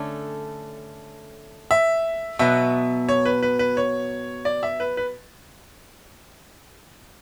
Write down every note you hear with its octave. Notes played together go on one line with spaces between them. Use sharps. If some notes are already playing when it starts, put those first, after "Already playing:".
Already playing: D3 A3 C#4
E5
B2 F#3 B3 E5
C#5
B4
B4
B4
C#5
D5
E5
B4
B4